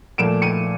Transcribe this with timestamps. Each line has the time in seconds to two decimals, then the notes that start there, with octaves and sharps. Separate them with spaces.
0.18 A#2 F3 A3 D7 E7
0.42 C#7 D#7